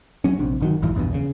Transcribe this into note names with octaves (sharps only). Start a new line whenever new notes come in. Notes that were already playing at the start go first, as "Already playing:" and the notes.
F#3 C#4
A#1 C3 D4
G1 D#3 F#3
A#1 G2 E3 F3
A#1 E2 G2 B2
C#3